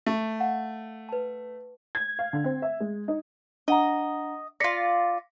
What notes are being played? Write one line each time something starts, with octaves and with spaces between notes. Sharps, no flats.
A3
F5 F#5
B4 A5
G#6
F5
D3
C4
E5
G#3
D#4
D4 D#5 F#5 A#5
F4 D5 A#6 B6 C#7